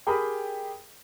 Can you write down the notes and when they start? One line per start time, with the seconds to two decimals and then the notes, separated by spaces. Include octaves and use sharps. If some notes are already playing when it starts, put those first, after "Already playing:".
0.07 G4 G#4 A#4 G5 B5 D#6